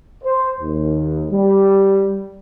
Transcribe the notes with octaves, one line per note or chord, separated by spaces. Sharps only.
C5
D#2
G3